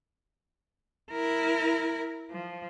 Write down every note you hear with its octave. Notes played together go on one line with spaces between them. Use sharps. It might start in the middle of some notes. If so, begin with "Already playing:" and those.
E4 A#4
F3